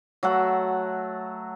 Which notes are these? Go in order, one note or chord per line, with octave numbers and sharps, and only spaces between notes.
F#3 A3 A4 F#5